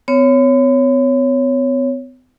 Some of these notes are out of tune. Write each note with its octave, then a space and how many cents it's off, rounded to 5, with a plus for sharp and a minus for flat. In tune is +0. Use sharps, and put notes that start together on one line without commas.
B3 +45 C#5 +0